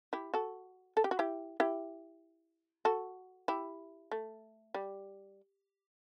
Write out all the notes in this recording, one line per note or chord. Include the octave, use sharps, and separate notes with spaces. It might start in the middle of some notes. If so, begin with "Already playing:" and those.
E4 G4
F#4 A4
A4
G4
F#4
E4 G4
E4 G4
F#4 A4
E4 G4
A3
G3